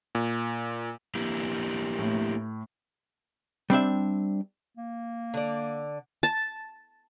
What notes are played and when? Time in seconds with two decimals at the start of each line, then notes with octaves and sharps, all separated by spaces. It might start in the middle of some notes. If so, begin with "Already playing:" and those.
0.15 A#2
1.15 A#3 E4 G4
1.99 A2
3.70 G3 C4 D4 E5
4.77 A#3
5.34 D3 D5
6.23 A5